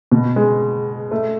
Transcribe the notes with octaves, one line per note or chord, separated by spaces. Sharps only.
B2
G#3
A3